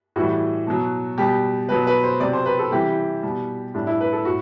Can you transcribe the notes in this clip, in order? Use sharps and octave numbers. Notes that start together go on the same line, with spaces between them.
A2 E3 G3 F#4
B2 F#3
B2 G3 G4
B2 F#3 B4
B4
C5
C3 F#3 D5
C5
B4
A4
C3 E3 G3 G4
B2 G3
A2 G3 D4
E4
B4
A4
A2 F#4